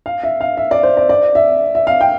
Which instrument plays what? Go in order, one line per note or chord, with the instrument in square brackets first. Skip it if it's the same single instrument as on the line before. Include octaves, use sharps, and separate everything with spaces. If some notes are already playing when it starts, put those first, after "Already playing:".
[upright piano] F5
E5
F5
E5
D5
C5
D5
D5
E5
E5
F5
G5